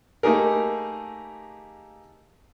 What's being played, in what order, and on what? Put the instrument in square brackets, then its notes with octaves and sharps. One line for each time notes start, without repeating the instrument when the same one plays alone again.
[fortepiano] A3 A#3 D#4 G4 G#4 A#4